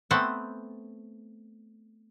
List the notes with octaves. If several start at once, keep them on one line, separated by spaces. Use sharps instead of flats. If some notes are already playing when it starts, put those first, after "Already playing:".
A3 B3 C4 F#5 G5 A5